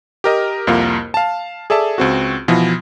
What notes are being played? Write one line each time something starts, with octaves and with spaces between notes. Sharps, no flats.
G4 A#4 D#5
C2 F2 A#3 F4 A#4
F5 A5
G#4 A4 D5 E5 A5
C#2 C4 F#4
B2 E3 F3 E4